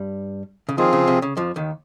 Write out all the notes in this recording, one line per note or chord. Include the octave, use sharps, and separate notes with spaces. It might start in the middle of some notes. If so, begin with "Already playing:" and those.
Already playing: G2 G3
C#3
D#2 D#3 F3 C4 F4 G#4
C#3
C3
C#3
F2 F3
D#2 D#3